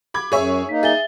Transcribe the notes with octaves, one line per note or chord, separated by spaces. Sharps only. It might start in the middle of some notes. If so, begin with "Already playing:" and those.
B5 D6 G#6
F#2 G#4 C#5 E5
A#3 D#4 B6
G#4 E5 A6 G7